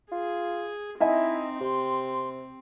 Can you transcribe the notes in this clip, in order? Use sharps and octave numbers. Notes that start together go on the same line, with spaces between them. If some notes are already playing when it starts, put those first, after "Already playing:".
F4 G#4
C4 D#4 E4 D#5 E5 G#5
C3 G4 C6